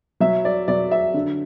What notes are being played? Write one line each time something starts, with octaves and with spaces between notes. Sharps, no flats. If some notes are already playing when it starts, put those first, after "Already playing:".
F#3 E5
D5
F#3 D5
E5
D3